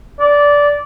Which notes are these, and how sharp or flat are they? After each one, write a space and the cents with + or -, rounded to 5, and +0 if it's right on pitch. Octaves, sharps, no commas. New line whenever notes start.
D5 -15